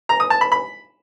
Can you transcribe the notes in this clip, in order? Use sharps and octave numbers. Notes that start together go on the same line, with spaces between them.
A#5
D#6
A5
B5
B5